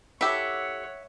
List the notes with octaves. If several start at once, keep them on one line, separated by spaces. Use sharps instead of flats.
E4 G4 A4 C#5 E5 F#5